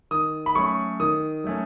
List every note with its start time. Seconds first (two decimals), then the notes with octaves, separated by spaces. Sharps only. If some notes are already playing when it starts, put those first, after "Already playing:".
0.11 D#3 D#6
0.46 B5
0.55 F#3 A3 C#4 C#6
1.00 D#3 D#6
1.44 F#3 A3 C#4